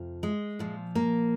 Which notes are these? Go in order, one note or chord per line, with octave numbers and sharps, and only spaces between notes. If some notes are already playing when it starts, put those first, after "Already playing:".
Already playing: F2 C3 F3
G#3
A#2 F3
A#3